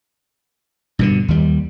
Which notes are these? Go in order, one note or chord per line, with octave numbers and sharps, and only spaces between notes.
G2 B2 D3
D#2 G3